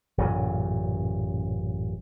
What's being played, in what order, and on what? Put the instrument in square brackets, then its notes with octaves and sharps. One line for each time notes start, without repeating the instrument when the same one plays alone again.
[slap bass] A1 F#2 A#2 C#3